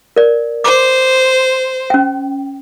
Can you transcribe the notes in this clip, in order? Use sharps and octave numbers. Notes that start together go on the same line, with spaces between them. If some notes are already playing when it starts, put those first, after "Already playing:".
A#4 D5
C5 D6
C#4 G5